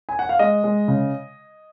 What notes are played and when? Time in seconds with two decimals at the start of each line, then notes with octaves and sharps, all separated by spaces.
0.09 G#5
0.19 F#5
0.29 F5
0.39 G#3 D#5
0.64 G#3
0.88 C#3